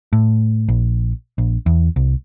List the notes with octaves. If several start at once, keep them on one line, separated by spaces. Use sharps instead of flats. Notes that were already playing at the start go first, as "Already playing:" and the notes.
A2
A#1
A#1
E2
C2